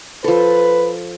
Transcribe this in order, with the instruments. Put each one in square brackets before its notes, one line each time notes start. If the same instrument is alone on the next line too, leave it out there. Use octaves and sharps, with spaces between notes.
[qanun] F3 A4 [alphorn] B4